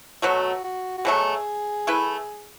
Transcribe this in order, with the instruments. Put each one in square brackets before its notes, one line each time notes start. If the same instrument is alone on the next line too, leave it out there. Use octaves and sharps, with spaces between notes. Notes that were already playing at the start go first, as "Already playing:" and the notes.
[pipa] B2 F#3 A3 [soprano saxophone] F#4
[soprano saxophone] F#4
F#4
[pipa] B2 F#3 A3 [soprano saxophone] G#4
[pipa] A3 E4 B4